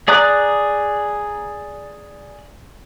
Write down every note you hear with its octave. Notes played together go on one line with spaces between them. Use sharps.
G#4 D5 A#5 D#6 F#6